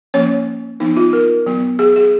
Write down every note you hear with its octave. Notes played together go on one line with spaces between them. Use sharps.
F3 A#3 C#4 C#5
F3 B3 D#4
F4
A#4
F#3 B3
G#4
G#4